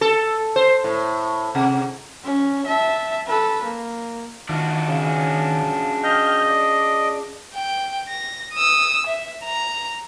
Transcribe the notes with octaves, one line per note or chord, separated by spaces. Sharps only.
A4
C5
A2
C3
C#4
E5 A5
A4 B4
A#3
D#3 D4 F4 F#4
C#3
D#5 G5 F6 G6
D5
G5
A#6
D#6 E6
E5
A#5